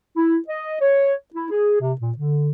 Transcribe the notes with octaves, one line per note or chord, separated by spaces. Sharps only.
E4
D#5
C#5
E4
G#4
C3
A#2
D3